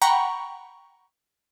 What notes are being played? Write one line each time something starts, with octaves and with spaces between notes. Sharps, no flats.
F#5 G5 A#5 B5 C#6